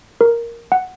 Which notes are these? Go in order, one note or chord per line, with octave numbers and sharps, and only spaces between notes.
A#4
F#5